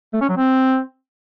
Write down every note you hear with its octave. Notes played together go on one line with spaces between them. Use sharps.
A3
C#4
F#3
C4